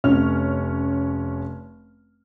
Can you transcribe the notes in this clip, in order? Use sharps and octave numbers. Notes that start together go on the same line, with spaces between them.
F1 C#4 F6